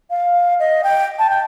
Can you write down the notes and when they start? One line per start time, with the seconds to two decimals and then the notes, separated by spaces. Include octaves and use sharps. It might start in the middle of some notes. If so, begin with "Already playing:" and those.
0.10 F5
0.60 D#5
0.84 G5
1.19 A5
1.30 G5